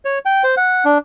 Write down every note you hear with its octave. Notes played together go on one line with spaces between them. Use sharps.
C#5
G5
C5
F#5
D4